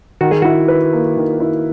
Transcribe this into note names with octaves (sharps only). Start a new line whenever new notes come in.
D#3 F#4
G#4
E4 F#4
B4
A#3
D#3
E4